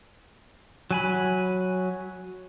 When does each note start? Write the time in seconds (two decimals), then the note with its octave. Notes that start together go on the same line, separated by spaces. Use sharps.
0.91 F#3 G#5 B5